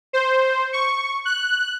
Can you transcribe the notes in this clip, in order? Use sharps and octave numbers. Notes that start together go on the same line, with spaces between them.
C5
C#6
F#6